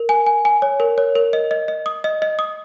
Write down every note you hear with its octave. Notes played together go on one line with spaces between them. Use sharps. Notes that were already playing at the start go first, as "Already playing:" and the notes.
Already playing: A#4
G#5
G#5
G#5
C#5
A#4
C#5
A#4
D#5
D#5
D#5
D#6
D#5
D#5
D#6